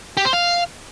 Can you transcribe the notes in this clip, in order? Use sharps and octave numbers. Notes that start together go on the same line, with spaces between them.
G4
C5
F5